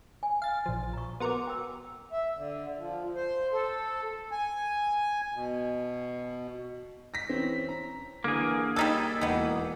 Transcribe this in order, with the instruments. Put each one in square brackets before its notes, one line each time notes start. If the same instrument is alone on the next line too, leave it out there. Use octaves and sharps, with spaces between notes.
[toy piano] G#5
[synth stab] F5 A6
A#1 F3
[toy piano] A#5 C#6
[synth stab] B3 F#4 A#4 [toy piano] C6 D6
[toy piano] G5 E6
[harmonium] E5
D3
F3
C5
A4
[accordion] G#5
B2
[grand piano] A#6 B6
E3 C4 C#4
A#5
[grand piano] D3 E3 [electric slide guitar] A#3 G#4
[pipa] G3 D#4 A4 [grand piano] E6 G#6 B6
[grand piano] E1 E3 [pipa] D#3 B3